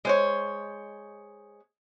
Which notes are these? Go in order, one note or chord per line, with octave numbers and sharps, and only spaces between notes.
G#3 C5 C#5